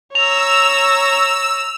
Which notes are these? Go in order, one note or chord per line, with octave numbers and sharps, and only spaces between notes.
C#5 A#5 E6 F7